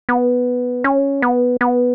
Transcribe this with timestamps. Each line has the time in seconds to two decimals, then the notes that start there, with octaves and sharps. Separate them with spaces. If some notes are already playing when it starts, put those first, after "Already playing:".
0.09 B3
0.84 C#4
1.22 B3
1.61 B3